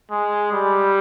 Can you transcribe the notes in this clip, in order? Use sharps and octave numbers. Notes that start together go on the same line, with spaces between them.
G#3
G3